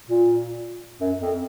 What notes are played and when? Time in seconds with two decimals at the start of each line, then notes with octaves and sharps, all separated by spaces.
0.09 A#2
1.01 F#2
1.21 F2